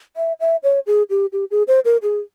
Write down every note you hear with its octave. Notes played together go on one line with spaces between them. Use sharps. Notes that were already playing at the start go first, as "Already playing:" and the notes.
E5
E5
C#5
G#4
G4
G4
G#4
C5
A#4
G#4